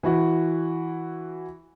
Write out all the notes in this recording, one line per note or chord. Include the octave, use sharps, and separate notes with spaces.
E3 E4 F#4